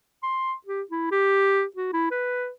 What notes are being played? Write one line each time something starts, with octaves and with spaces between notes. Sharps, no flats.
C6
G4
E4
G4
F#4
E4
B4